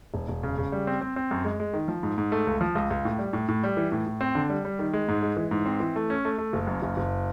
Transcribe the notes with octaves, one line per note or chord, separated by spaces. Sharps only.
E1
E1
C#3
C#3
G3
C4
C4
C4
F#2
G#3
G#3
D#3
F3
G#2
G#2
A3
C#2
F3
C#2
C#2
A2
G3
A2
A2
G3
E3
A2
A2
C4
D3
G3
G3
D#3
G#3
G#2
G#3
E3
G#2
C4
E3
A3
C#4
A3
A3
F#1
F#2
F#1
F#1